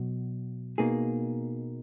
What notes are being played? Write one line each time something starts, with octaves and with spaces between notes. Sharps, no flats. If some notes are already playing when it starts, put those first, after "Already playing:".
Already playing: B2 F#3
B2 A#3 D#4 G#4